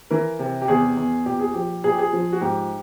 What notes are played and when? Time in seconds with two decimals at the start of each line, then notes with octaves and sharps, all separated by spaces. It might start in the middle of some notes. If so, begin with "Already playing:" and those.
0.11 E3 A#4
0.39 C3
0.62 G4
0.68 E2 G#4
0.97 E2
1.26 A#2 G4
1.39 G#4
1.54 F3 G4
1.84 A#2 G#4
1.92 G4
1.99 G#4
2.13 F3
2.32 F#4
2.41 G#2 G4